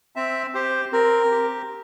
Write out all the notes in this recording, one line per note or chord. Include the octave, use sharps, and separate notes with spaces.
C4 E5
G4 C5
C4 A#4
G4